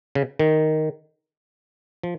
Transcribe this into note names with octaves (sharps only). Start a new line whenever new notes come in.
C#3
D#3
F3